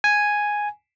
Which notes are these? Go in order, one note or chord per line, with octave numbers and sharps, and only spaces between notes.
G#5